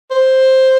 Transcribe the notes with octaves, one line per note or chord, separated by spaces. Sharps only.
C5